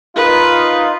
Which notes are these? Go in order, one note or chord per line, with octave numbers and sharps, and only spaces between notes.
D#4 F4 B4